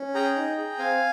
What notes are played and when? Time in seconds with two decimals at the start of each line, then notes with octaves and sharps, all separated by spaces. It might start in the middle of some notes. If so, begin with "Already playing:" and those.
Already playing: C#4
0.15 G#4 G5 A#5
0.36 D#4
0.58 G#4
0.79 C4 F5 G#5